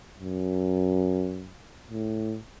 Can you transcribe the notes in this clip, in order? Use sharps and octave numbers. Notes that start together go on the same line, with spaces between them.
F#2
A2